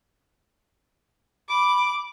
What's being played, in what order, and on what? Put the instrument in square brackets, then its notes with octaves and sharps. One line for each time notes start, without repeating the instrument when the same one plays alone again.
[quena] B5 [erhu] D6